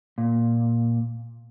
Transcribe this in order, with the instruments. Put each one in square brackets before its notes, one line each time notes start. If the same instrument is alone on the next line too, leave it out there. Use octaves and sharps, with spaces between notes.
[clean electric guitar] A#2